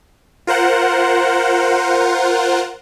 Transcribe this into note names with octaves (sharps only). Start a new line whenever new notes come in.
F4 A#4 C5 F#5